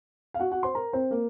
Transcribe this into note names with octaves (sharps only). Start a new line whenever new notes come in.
F5
F#4 F#5
F#4 F#5
C5 C6
A#4 A#5
C4 C5
A#3 A#4